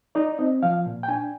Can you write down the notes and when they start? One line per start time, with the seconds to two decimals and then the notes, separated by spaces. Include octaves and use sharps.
0.15 D#4 D5
0.39 C4 D#5
0.63 F3 F5
0.86 A#2
1.03 G5
1.08 D4 G#5